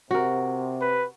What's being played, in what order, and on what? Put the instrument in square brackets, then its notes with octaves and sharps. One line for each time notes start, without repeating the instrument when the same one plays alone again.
[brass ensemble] C3 [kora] F#4 A#4
[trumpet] B4